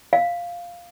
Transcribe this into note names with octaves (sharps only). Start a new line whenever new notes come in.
F5